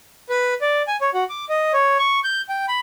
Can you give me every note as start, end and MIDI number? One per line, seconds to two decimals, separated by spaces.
0.29 0.54 71
0.61 0.82 74
0.88 0.96 80
1.01 1.10 73
1.14 1.24 66
1.30 1.45 86
1.49 1.72 75
1.73 1.97 73
1.99 2.20 85
2.24 2.42 91
2.49 2.66 79
2.68 2.80 83